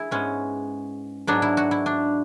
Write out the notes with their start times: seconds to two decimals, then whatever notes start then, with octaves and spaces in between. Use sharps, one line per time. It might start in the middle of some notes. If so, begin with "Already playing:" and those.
Already playing: E4 G#4
0.11 G#2 G#3 B3 C#4
1.27 G#2 F#3 B3 D4
1.42 E4
1.57 F#4
1.71 E4
1.86 D4